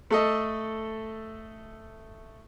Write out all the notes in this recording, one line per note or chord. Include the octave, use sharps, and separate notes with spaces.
A3 A4 D#5